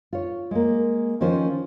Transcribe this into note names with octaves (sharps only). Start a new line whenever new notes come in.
F4 C#5
G#3 A#3
D#3 F3 C#4 F4 C5